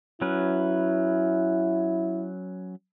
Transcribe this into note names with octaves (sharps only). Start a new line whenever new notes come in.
F#3 C#4 E4 B4